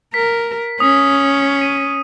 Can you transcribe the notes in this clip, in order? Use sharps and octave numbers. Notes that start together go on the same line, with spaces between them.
A#4 B6
C#4 D#6
D#7